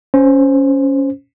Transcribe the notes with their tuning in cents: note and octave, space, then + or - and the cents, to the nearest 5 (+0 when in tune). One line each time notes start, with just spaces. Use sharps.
C#4 +0 C5 +0